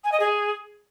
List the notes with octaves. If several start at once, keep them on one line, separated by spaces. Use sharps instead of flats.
G#5
D#5
G#4